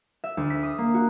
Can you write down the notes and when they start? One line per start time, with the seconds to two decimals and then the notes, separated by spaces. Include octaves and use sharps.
0.24 E5
0.37 D2
0.50 B6
0.63 D#6
0.78 A#3
0.94 F#4